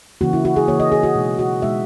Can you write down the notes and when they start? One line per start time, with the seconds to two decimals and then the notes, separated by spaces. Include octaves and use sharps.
0.21 C#3 E3 A#3 F#4
0.33 E4
0.45 F#4
0.56 G#4
0.68 C#3 E3 A#3 C#5
0.80 D#5
0.92 G#4
1.03 F#4
1.15 B2 G#3 D#4
1.39 F#4
1.62 B2 G#3 D#4 E5